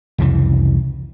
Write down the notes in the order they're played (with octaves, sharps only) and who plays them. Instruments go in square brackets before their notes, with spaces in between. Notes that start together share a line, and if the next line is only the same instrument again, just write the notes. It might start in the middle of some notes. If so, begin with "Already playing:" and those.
[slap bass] C2 F2 C#3 E3